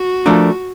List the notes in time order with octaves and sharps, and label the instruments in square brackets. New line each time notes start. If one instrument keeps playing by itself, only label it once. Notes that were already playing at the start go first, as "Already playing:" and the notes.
Already playing: [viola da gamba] F#4
[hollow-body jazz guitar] F3 A3 D4 F4 A#4